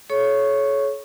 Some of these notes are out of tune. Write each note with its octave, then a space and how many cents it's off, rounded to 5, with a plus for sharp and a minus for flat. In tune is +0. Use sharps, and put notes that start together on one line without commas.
A4 -45 C#5 +0 C#6 -5